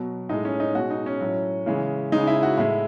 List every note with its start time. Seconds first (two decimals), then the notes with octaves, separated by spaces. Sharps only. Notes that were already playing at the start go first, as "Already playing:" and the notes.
Already playing: B2 F#3
0.29 A2 G#3 D#4
0.45 C#4
0.60 D#4
0.75 B2 G#3 F#4
0.90 D#4
1.06 C#4
1.20 A2 F#3
1.66 C#3 E3 G#3
2.12 C#3 G#3 D#4
2.27 E4
2.43 F#4
2.57 A2 G#3 E4